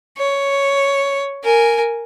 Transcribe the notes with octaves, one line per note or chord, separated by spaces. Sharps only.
C#5
A#4 G#5